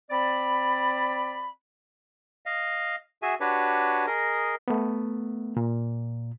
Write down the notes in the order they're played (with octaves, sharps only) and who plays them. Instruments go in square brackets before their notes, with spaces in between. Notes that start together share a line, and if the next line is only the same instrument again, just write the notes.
[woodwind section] C4 D5 B5
[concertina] D#5 F5
F#4 G#4 E5 G#5
D4 F#4 G4 B4 C#5
G#4 A#4 D#5
[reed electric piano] A3 B3
A#2